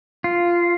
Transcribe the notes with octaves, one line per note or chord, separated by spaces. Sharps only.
F4